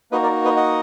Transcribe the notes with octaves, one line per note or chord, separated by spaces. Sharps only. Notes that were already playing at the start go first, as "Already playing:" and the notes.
A#3 D#4 F#4 B4 D#5
A#4 D5
B4 D#5
D#5 F#5